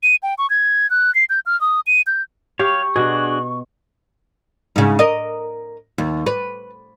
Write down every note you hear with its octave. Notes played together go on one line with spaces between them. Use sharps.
D#7
G5
C#6
G#6
F#6
C7
G6
F6
D#6
D#7
G6
G4 C#5 F5 C#6
B2 D4 F#4 G#4
G#2 C#3
A#4 D#5
D#2
B4